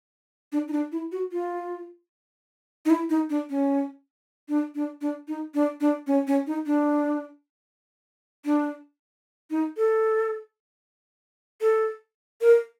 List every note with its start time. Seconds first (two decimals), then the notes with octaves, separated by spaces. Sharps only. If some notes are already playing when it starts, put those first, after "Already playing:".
0.52 D4
0.68 D#4
0.73 D4
0.92 E4
1.12 F#4
1.32 F4
2.86 D#4
2.90 E4
3.10 D#4
3.30 D4
3.50 C#4
4.49 D4
4.75 D4
5.01 D4
5.28 D#4
5.54 D4
5.81 D4
6.07 C#4
6.27 C#4
6.47 D#4
6.66 D4
8.45 D4
9.51 D#4
9.77 A4
11.61 A4
12.41 A#4